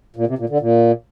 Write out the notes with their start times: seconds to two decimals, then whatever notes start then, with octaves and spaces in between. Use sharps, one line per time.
0.16 A#2
0.27 C3
0.38 A#2
0.49 D3
0.60 A#2